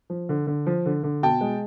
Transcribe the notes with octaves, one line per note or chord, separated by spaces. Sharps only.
F3
D3
D3
F3
D3
D3
B2 G5 A5
G#3